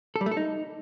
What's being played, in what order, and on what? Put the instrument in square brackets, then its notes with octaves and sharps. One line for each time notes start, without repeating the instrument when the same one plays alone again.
[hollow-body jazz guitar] A4
G3
A3
A4
D#4